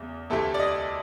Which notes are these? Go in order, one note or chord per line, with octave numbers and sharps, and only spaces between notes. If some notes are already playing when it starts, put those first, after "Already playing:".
Already playing: E2 C#3 F#3 A3
D2 C3 E3 A3 A4
D5
D#5